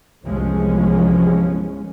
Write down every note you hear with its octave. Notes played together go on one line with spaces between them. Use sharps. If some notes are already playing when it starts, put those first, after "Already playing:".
G1 C2 E3 F3 G#3 C#4